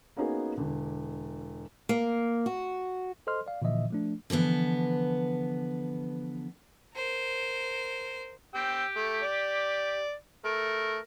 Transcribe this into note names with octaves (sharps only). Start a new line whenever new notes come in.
A#3 B3 C#4 D#4 F#4 G#4
E1 D3
A#3
F#4
A4 C5 D#5 C6 F6
D5 F5
A#2 D3 E3 F3 D#5 E5
F3 A3 D4
D3 E3 F3 B3
A#4 C5
G4 G5 E6
A3
D5
A3 A#4